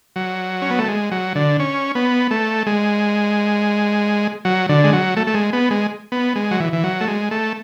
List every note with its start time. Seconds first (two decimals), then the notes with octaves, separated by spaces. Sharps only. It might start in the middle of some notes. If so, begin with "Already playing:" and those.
0.16 F#3
0.62 C#4
0.70 B3
0.79 A3
0.88 G#3
1.11 F#3
1.35 D3
1.60 C#4
1.95 B3
2.31 A3
2.67 G#3
4.45 F#3
4.69 D3
4.84 G#3
4.93 F#3
5.17 A3
5.27 A3
5.34 G#3
5.53 B3
5.71 G#3
6.12 B3
6.36 G#3
6.51 F#3
6.60 E3
6.73 E3
6.84 F#3
7.01 A3
7.07 G#3
7.31 A3